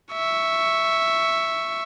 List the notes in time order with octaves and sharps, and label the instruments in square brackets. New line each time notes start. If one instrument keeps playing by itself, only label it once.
[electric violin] E5 C#6